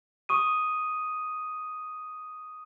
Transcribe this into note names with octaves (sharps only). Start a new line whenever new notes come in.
C#6 D#6 D#7